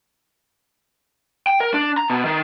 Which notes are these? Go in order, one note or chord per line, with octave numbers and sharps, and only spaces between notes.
G5
A#4
D4
A#5
B2
D#3